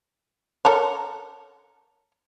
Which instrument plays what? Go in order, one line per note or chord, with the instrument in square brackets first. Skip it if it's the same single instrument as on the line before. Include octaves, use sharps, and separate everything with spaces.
[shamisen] A4 A#4 C#5